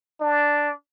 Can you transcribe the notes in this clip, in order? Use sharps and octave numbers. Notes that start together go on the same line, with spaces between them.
D4